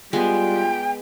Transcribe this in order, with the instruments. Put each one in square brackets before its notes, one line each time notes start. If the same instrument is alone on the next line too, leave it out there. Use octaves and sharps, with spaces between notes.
[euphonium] G3 [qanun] G#3 B3 [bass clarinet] F4 [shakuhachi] G5